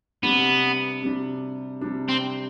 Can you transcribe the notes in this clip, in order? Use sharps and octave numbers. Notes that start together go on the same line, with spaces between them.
C3 G3 B3 D4
C3 G3 D4
C3 G3 D4
C4